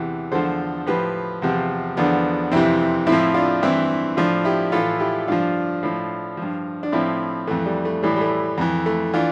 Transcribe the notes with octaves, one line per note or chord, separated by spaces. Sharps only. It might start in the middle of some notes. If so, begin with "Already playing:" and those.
Already playing: E2 C3 E3
E2 D3 F3 A4 C5
A2 F3 G4 B4
E2 C3 F3
E2 D3 F3 B3 D4
F2 C3 E3 C4 E4
A2 C4 E4
F3
D4 F4
G2 E3 C4 E4
A2 F3 D4 F4
E4 G4
A2 E3 F4 A4
E4 G4
G2 F3 D4 F4
A2 F3
G2 F3
D4
A2 F3 C4 E4
F2 E3 A3
G3
A3
A2 E3 G3
G3
A3
F2 E3
A3
E3 D4 F4